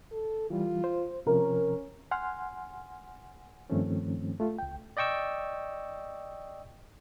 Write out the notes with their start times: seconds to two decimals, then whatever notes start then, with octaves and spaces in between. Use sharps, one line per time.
0.12 A4
0.50 E3 G3 F4
0.84 C5
1.27 C3 F3 C#4 A#4
2.11 F#5 G#5 C6 F6
3.70 G2 D#3 F3 A3 C4 C#4
4.40 A3 F4
4.59 C#2 G5
4.97 D5 D#5 G5 C#6 E6